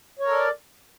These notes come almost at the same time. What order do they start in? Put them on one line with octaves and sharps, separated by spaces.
C#5 A#4 A4 D5